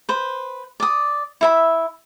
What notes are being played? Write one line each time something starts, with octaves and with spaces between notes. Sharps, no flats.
B4 C5
D5 D#6
E4 E5 B5